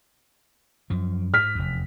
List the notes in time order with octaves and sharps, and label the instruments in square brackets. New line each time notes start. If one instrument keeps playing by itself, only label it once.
[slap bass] F#2 F3
[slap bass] G#2 [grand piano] F6 B6
[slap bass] F1 E2